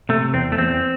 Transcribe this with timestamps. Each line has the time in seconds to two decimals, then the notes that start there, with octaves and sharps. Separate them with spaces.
0.09 C3 A3
0.34 E2 C4
0.52 A3
0.58 E2 C4